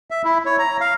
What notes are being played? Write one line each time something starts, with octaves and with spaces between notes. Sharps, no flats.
E5
E4
C#5
A#5
F5